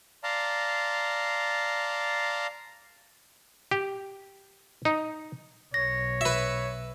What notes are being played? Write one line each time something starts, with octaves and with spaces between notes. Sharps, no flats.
D5 F5 A5 A#5 C6
G4
D#4
B1 C#5 A#6
B4 E5